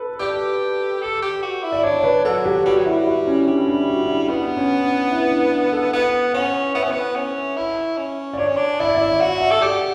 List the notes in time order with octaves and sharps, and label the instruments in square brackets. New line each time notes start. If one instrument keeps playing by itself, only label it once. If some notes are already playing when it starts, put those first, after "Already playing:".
Already playing: [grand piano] A4 B4
[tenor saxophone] G4 [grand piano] D5
[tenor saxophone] A4
G4
F#4
E4
[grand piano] D5
[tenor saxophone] D4 [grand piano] C#5
[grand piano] C#5
B4
[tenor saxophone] F#3 [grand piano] A4
[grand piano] G4
[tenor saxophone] G3 [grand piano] F#4
[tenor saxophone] F#3
[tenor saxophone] G3 [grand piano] E4
[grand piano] E4
C#4
[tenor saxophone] G3 [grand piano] D4
[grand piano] D4
F#4
D4
E4
[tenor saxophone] B3 [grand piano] D4
[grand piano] C#4
D4
E4
D4
D4
A4
[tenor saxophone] B3 [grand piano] B4
[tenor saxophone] C#4 [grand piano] F#5
[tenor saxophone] B3 [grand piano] E5
[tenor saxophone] C#4
B3
C#4
E4
C#4
[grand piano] D5
[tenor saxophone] D4 [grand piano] C#5
[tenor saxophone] C#4
D4
[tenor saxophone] E4 [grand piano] D5
[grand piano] E5
D5
E5
D5
[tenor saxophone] F#4 [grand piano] F#5
[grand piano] E5
[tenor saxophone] A4
[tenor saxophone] G4 [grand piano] D5